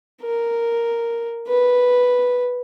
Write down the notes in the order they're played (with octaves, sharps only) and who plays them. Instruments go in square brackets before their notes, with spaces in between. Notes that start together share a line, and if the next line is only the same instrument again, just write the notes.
[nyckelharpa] A#4
B4